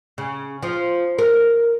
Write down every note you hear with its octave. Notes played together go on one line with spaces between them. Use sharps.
C#3
F3
A#4